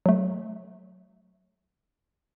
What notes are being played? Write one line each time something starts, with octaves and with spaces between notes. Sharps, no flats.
F#3 A3